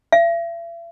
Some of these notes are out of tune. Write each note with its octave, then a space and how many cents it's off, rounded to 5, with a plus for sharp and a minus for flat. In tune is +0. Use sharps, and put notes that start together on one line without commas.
E5 +45